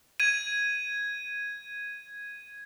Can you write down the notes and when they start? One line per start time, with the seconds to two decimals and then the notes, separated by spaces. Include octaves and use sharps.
0.20 G#6 D#7